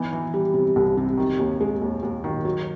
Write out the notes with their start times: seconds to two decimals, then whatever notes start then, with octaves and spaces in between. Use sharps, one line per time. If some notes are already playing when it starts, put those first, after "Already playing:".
Already playing: E3 B3 D#4
0.13 E3
0.34 G3
0.54 C3
0.76 C2
0.97 C3
1.17 D#3
1.39 D#2
1.61 G#3
1.82 D#2
2.03 D#2
2.24 D#3
2.45 F#3